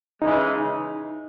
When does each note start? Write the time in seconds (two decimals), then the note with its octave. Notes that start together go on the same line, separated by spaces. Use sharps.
0.21 C#3 E3 G#3 D#4